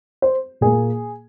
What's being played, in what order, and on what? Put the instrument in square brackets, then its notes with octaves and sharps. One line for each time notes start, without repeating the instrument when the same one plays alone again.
[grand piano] C5
A#2 A#3 G#4